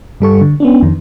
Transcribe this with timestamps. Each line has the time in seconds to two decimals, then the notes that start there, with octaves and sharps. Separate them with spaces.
0.20 G2 G3 A4 C#6
0.41 D3
0.60 B3 C#4 D4
0.83 F2 D#3